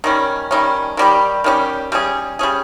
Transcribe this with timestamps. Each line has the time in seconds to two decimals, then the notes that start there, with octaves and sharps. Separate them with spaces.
0.04 D#3 G3 C#4
0.51 D#3 G3 C#4
0.97 D#3 G3 C#4 G4
1.44 D#3 G3 C#4 G4
1.92 G3 C#4 G#4
2.39 G3 C#4 G#4